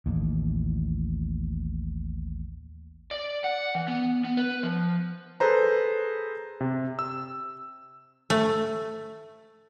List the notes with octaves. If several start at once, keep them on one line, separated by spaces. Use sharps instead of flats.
A1 D#2
D5
F#5
E3
B3
B3
B4
F3
G#4 A4 B4 C5 A#5
C3
E6
A3